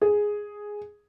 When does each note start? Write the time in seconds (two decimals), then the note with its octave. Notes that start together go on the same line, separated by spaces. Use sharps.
0.02 G#4